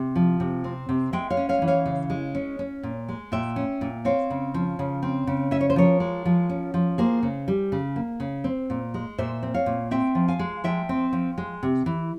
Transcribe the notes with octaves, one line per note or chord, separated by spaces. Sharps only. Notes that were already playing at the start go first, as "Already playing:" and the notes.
Already playing: C3
F3
C3
C4
C3
G#3 E5 G5
C#5 F5
C#4
C#5 F5
E3
C#5 F5
C#3
G#3
C#4
C#4
A#2
G#3
A#2 E5 G5
C#4
A#2
C4 C#5 F5
C#3
F3
C#3
C4
C#3
C#4 E5
C#5
C5
F3 A#4 C#5
G#3
F3
C#4
F3
A#3 G#4 C5
C#3
G3
C#3
A#3
C#3
C4
A#2
G#3
A#2 C5 E5
C4
C#5 F5
A#2
C4 E5 G5
F3
F5 G#5
G#3
F3 E5 G5
C4
F3
G#3
C3
E3